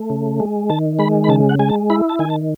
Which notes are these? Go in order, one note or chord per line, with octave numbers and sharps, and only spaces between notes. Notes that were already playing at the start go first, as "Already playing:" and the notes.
Already playing: A3
C#3
G#3
D#3 A5
G#3 B5
B5
C#3 A5
F#5
G#3 G#5
A5
E4 B5
A5
D#3 G#5
A5